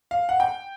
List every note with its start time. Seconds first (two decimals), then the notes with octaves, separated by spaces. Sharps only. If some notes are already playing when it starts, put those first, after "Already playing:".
0.11 F5
0.29 F#5
0.40 G5